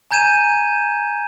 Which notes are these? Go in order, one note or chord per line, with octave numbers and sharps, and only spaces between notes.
G#5 A#5 G6 G#6 D#7 E7